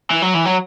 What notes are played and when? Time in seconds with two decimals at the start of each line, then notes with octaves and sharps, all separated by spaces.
0.10 E3
0.22 F#3
0.34 E3
0.45 F#3